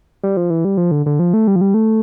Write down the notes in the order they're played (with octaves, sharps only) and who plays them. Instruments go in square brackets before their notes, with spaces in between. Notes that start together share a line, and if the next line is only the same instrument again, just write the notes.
[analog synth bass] G3
F3
E3
G3
F3
D3
D3
F3
A3
G3
F3
G3
A3